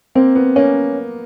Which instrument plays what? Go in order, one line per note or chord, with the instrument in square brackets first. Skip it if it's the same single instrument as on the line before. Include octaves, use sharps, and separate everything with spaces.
[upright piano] A#3 [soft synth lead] C4
[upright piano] B3
[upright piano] A#3 [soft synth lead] C#4